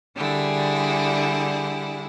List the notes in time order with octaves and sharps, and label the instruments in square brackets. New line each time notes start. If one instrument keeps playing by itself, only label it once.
[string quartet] D3 G3 E4 G#4